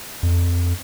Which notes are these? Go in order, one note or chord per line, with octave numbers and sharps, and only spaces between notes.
F2